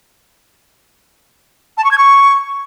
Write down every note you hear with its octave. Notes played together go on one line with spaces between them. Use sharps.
A5
C#6
G#6
C#6